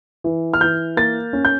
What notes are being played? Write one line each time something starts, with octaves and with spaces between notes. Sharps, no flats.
E3
F6
E3 G6
A#3 A6
C#4
G6